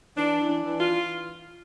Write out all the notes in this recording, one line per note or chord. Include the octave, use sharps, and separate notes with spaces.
E3 D4
E3
D4
E3
F4
E3